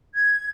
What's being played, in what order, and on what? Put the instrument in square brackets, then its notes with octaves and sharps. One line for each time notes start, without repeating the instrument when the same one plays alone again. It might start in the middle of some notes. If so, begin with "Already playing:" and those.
[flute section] G#6